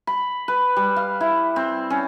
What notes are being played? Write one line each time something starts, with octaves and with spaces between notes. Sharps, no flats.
B5
B4
G3
F5
E4
C4
C#4